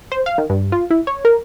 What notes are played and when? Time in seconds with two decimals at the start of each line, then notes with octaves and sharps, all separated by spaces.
0.12 C5
0.26 F5
0.38 D#3
0.50 G2
0.72 F4
0.91 E4
1.07 C#5
1.25 A#4